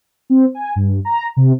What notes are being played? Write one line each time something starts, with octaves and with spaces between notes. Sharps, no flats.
C4
G#5
G2
A#5
C3